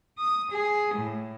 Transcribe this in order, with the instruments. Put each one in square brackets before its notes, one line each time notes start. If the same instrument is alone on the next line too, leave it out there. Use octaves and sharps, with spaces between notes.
[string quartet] D#6
G#4
A2